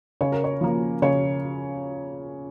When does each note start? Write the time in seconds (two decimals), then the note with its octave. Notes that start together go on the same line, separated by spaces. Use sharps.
0.21 C#3 C#5
0.32 A#4
0.44 C#5
0.61 F3 A#3
1.02 C#3 C#5